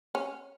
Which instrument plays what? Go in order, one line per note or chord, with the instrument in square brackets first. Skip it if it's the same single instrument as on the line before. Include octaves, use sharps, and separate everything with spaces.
[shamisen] C#4